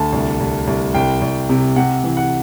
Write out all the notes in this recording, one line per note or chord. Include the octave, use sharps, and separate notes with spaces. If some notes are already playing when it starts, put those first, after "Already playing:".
Already playing: D2 A5
C2
C2
C2
C2 G5
C2
C3
C3 F#5
E3
F#5